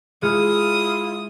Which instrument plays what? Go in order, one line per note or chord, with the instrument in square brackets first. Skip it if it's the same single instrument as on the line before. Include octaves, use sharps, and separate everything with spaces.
[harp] G#3 F6 C#7 [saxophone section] E4 F4 [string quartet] D#6